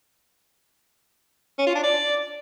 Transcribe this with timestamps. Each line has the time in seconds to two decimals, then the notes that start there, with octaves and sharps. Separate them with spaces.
1.59 C#4
1.67 F4
1.75 D4
1.83 D5